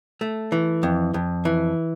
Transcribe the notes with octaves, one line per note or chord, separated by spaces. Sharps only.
A3
E3
F2
F2
E3